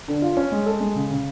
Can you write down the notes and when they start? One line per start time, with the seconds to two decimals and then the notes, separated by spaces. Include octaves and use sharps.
0.08 D3
0.22 F4
0.37 C#4
0.52 G#3
0.66 A4
0.81 G#3
0.95 C#3
1.10 C#3